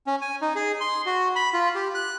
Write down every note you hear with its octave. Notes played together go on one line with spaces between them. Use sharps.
C#4
G#5
D#4
G#4
C6
F#4
B5
F4
G4
F#6